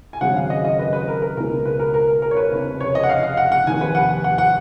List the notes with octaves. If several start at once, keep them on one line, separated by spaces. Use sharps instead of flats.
G#5
G#1 F#2 C#3 F#5
F5
D#5
D#5
B4
B4
A#4
A#4
C#2 B2 A#4
B4
A#4
A#4
A#4
C#5
B4
F1 F2 C#3
C#5
D#5
F#5
F5
F5
F#5
F#5
F1 D#2 D#3 G#5
B4
F#5
F#5
F#5